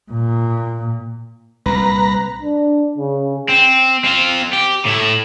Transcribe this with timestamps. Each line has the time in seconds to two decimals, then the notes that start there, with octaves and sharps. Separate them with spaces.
0.11 A#2
1.66 C2 A#2 B4 A#5
2.42 D4
2.98 C#3
3.49 C4
4.05 C4 F4
4.53 G4
4.85 A2 E4